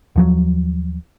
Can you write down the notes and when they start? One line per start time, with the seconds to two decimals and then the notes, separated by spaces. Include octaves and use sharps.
0.16 D#2 F3 F#3